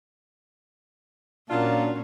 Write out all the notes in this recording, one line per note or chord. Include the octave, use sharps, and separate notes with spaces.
A#2 F#3 A#3 C#4 D4 F4 A5